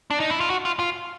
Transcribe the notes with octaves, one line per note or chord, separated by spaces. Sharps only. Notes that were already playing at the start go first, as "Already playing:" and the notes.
D4
D#4
E4
F4
F#4
F4
F4